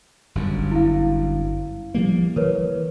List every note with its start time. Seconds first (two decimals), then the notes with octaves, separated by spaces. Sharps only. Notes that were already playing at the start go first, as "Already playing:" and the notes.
0.35 G1 F#2
0.72 E4 F5
1.95 F3 G3 A#3
2.36 E3 A#4 B4 C#5